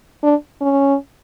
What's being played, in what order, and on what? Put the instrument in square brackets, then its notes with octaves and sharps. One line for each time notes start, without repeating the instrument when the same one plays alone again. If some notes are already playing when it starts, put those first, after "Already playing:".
[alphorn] D4
C#4